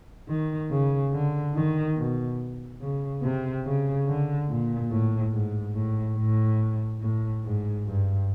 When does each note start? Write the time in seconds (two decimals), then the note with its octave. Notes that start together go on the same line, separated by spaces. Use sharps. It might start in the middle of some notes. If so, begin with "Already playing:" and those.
0.29 D#3
0.71 C#3
1.13 D3
1.55 D#3
1.97 B2
2.81 C#3
3.22 C3
3.65 C#3
4.07 D3
4.50 A#2
4.91 A2
5.33 G#2
5.76 A2
6.18 A2
7.01 A2
7.44 G#2
7.86 G2